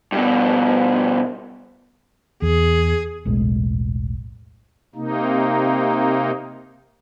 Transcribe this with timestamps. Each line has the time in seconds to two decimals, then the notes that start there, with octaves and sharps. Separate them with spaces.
0.12 G2 B2
2.42 E2 G#4
3.25 E1 B1 A2 G#3
4.95 C3 A#3 D#4